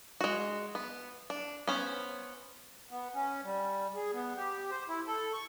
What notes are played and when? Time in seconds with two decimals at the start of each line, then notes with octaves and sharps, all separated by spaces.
0.21 G#3 F#4
0.75 B3
1.30 D4
1.67 B3 C#4 C5
2.91 B3
3.15 C#4
3.44 G3
3.96 G#4
4.13 B3
4.37 G4
4.71 C5
4.89 E4
5.07 A4
5.33 C#6